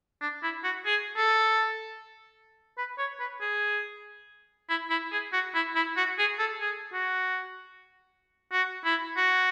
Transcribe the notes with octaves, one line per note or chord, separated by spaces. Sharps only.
D4
E4
F#4
G#4
A4
B4
C#5
B4
G#4
E4
E4
G#4
F#4
E4
E4
F#4
G#4
A4
G#4
F#4
F#4
E4
F#4